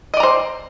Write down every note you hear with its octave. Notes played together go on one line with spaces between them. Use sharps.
C5 D5 D#5 A#5